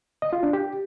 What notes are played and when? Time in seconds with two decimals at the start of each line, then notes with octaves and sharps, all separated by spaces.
0.22 D#5
0.33 F4
0.43 D4
0.53 G4